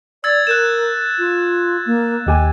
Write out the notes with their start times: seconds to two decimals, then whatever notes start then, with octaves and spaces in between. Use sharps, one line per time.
0.24 D5 E6 G#6 A6
0.47 A#4 F#6 G6 E7
1.18 F4
1.86 A#3
2.26 D#2 G4 D#5 G#5